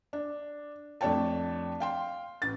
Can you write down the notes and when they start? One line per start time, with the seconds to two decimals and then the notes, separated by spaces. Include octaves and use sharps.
0.13 D4
1.01 F2 A3 D4 C#5 G5 A5
1.80 F5 G5 C6
2.42 A1 A6